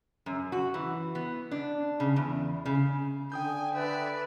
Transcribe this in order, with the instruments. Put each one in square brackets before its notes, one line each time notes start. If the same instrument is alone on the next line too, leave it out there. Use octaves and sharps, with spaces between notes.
[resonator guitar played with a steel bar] F#2
F#4
E3
B3
D4
C#3
E2
C#3
[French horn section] D3 [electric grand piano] G5 D#6 G6 [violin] G#5
[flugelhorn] B4 [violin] D5 E5